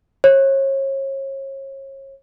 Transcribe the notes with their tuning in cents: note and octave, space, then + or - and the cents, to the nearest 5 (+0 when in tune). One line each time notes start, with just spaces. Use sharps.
C#5 -35